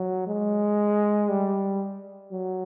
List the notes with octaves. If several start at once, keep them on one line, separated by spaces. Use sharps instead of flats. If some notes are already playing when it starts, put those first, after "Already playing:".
Already playing: F#3
G#3
G3
F#3